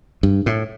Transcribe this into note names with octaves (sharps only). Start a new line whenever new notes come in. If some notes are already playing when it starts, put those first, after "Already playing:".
G2
A2